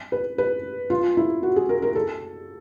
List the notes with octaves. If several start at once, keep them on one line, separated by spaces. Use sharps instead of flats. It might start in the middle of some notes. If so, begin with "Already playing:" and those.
B4
B4
F4
E4
F#4
G#4
A#4
A#4
A4